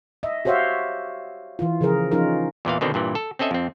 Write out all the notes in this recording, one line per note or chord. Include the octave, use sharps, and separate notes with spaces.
D#5 E5
F#4 G4 C5 C#5 E5 F5
E3 F4
C#3 F3 G#4 A#4
F3 C#4 D#4 F4 A#4
E2 A#2 E3 F5
B2 D3 D#3 C4
G2 A#2 E3
A4
C4 C#4 A4 D#5 E5
F2 C4